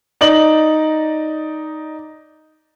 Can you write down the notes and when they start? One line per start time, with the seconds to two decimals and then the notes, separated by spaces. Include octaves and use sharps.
0.21 D#4 D5 F#7